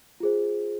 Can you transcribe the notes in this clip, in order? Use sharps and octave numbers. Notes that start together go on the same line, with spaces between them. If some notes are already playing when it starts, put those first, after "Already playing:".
F4 G#4 C5